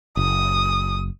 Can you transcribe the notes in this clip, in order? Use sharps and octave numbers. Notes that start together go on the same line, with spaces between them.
F#1 D#6